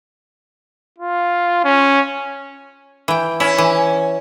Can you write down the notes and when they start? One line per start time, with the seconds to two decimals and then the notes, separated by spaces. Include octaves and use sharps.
0.98 F4
1.64 C#4
3.08 E3 G5
3.40 C#4 E4
3.58 E3